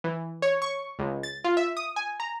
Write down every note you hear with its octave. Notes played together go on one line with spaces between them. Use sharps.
E3
C#5
C#6
C#2
A6
F4
E5
D#6
G#5
A#5